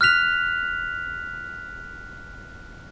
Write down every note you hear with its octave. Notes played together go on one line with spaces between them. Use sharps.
F6 F#6 B6 F7